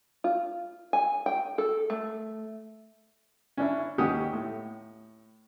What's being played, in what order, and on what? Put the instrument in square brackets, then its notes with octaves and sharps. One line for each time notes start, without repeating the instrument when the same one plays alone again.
[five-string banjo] F4
G#5
G5
A4
A3
[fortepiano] C#4 D4 E4
D#2 C#4 G4 F#5 D#6
A2